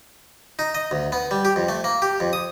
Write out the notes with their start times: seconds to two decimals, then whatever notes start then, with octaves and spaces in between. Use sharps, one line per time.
0.59 D#4
0.75 D#5
0.91 D2
1.12 B3
1.31 G3
1.45 G4
1.56 F2
1.69 A3
1.84 A#3
2.02 G4
2.20 F2
2.33 D#6